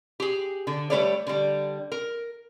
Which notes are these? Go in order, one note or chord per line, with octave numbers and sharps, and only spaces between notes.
G4 G#4
D3
G3 A3 A#4 B4 C#5 D5
D3 G3
A#4